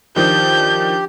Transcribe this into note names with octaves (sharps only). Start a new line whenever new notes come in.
D#3 F3 D4 G4 G6